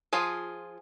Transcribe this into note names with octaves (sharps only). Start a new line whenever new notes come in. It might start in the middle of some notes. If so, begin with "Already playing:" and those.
F3 F4 G#4